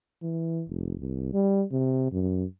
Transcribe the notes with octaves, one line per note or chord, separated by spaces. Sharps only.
E3
F1
C2
G3
C3
F#2